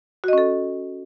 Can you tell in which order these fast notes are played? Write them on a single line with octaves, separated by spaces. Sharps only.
F#4 D#5 C#4 A4